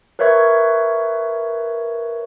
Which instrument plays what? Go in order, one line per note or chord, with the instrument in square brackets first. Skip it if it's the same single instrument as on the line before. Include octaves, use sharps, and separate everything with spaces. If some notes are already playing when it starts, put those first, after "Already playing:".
[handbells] A#4 B4 C#5 E5 C#6 G#6